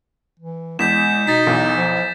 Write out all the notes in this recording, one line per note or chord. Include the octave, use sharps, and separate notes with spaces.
E3
E2 G#3 G6 B6 E7
B2 D#4 A6 B6
B1 E2
F3